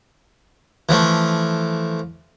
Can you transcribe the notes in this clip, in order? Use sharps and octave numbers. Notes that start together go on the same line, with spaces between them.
E3 F3 A3